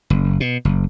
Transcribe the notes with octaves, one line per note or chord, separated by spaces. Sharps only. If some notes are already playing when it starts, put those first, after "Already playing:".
F#1
B2
F#1